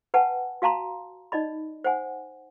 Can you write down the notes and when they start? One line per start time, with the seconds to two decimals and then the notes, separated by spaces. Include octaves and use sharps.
0.14 B4 F#5 G#5 A5
0.62 F#4 F5 A5 A#5 C6
1.32 D#4 D5 D#5 B5
1.84 C5 F#5 G#5